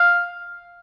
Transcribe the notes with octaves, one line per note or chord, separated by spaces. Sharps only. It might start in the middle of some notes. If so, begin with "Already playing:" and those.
Already playing: F5